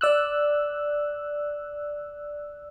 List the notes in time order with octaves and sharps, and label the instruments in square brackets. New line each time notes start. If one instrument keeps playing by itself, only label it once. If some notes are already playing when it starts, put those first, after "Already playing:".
[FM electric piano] D5 E6 F#6